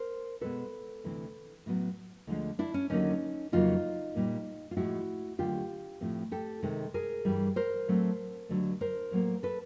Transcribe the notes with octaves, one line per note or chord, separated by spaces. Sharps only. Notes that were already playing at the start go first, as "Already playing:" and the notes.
Already playing: A#4 C5
B2 G#3 B3 A4 B4
D2 C3 E3 G#3 C4
A2 F#3 B3
D2 D3 F3 G#3
D4 E4
C#4
D#2 D3 F#3 A#3 C#4 D#4
F2 C#3 F#3 A#3 D#4 F4
A#2 G3 A#3
F4
A2 F3 G#3 E4 F#4
D#2 D3 F#3 A3 C4 F4 G4
A2 F3 A3 C4
G4 A4
C3 D#3 G#3 C4
G#4 A#4
G2 E3 G3
A#4 C5
A2 F#3 A3 C4
D#2 D3 F#3 A3
A#4 C5
A2 F#3 A#3
A4 B4